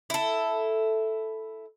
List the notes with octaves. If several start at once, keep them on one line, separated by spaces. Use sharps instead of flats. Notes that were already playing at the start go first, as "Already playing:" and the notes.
E4 A4